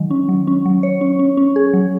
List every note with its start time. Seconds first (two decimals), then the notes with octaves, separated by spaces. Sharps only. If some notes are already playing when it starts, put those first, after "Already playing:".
Already playing: D#3 F#3 G#3
0.11 C#4
0.29 F#3
0.47 C#4
0.66 F#3
0.83 C#5
1.01 C#4
1.19 C#4
1.37 C#4
1.56 G#4
1.73 F#3